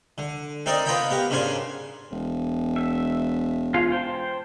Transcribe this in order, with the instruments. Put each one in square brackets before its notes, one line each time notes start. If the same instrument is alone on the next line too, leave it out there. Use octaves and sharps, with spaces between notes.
[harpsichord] D3
C4 D#4 A#4 D5 D#5
B3 F4 D#5 G5 A#5 B5
B3 G4 A#4
G#2 C#3 D4 A#4 G#5 C6
[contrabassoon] E1
[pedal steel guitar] E5
F4 G#4 F5
C5 G5 A5